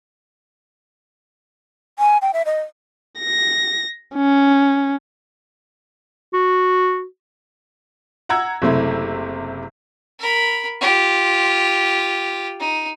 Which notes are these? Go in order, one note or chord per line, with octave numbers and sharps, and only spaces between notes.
G#5
G5
E5
D#5
A#6
C#4
F#4
F#5 A#5 E6 G#6
F#1 C3 A3 C4 E4
A#4 B5
F4 G4
D#4